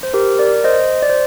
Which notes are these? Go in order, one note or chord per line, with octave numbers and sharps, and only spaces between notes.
C5
G4 A#4
A#4 D5
C5 D#5
D5
C5